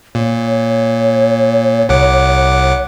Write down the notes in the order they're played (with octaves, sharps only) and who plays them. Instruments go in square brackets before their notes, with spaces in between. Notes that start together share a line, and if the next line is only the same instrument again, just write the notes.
[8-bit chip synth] A#2 [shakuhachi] C#5
[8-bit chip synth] C2 F#5 D6